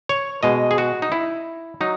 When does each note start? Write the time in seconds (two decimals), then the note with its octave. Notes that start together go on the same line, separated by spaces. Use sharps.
0.09 C#5
0.43 B2 G#3 D#5
0.71 G#4
0.78 F#4
1.02 D#4
1.12 E4
1.81 F#3 D#4